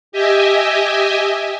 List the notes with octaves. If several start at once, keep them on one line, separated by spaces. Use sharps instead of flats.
G4 D#5 E5 G#5